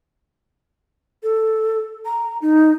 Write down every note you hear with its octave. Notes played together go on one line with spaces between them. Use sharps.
A4
A#5
D#4